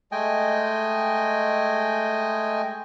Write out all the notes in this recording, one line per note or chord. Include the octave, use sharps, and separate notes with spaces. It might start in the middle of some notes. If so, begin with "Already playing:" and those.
G#3 A3 D#5 G5 G#5